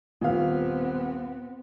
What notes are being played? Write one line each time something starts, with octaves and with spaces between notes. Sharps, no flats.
D#1 B3 C4 F5